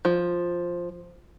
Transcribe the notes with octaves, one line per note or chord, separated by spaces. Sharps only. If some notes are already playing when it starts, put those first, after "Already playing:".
F3